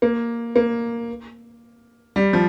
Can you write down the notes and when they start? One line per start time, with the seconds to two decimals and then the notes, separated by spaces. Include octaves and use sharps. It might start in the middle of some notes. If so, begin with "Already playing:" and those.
0.02 A#3
0.56 A#3
2.16 G3
2.33 F3